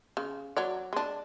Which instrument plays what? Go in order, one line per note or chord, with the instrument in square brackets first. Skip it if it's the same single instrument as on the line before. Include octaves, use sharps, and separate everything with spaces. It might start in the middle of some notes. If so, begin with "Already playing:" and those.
[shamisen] C#3
F#3 C#5 D5
G#3 D4